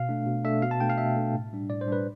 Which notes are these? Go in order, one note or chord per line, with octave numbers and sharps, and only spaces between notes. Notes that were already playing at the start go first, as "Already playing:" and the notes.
Already playing: B2 F5
A3 D4
B2
A3 D4 E5
B2 F5
A5
A3 D4 G5
F5
B2 E5
A3 D4
A2
G3 D4
A2 D5
C5
G3 D4 B4